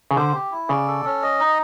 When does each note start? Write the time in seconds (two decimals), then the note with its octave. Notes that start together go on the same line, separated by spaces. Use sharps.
0.11 C#3
0.16 D3 C5
0.34 G4
0.52 E4
0.69 C#3 D5
0.87 A4
1.05 C#4
1.23 D#5
1.40 D#4